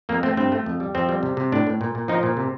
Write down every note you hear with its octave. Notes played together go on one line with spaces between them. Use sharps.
F2 A#3
A3 C4
G2 C4
A3
F2
G3
F2 C4
G3
C3
C3
A2 D4
A2
A#2
A#2
F3 D#4
A#2
C3